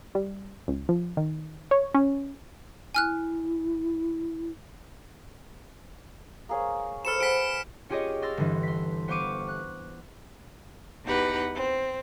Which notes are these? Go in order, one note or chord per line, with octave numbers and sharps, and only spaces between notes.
G3
C#2
F3
D#3
C#5
C#4
E4 G#5 F6 F#6
A#3 G#4 C#5
A4 B4 C5 F6 C#7 E7
G#4 F#5 B5 B6 D7
C#4 F4 G4 G#4 C#5 D#5
F5 C6 E6 A6 A#6
G1 E3
C6 B6
B3 C5 F5 C#6 D6 D#7
F#6
E2 D#4 G4 B4 F#5
C4